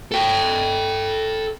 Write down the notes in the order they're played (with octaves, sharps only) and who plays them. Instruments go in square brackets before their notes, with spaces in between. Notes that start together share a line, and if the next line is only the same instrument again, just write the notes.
[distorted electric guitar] A4 G5